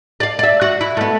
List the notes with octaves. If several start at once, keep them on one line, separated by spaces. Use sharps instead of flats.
D5 F5
D5 E5
F#4
E4
A3 B3